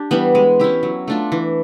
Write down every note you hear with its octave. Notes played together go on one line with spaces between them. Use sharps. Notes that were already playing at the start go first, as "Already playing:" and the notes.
Already playing: D4 G4
E3 G3 B3
G#3
C#4 E4 G4
F#3
A3 D4 F4
E3